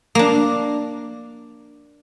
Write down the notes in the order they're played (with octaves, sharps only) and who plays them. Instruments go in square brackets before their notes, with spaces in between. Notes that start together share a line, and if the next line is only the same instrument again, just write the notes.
[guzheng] A#3 D4